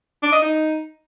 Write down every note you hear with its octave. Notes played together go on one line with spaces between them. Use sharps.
D4
D#5
D#4